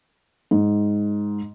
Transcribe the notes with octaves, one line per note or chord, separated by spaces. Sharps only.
G#2